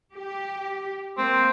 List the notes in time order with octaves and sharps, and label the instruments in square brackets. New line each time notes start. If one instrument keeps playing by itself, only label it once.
[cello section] G4
[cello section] A#3 [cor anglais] C4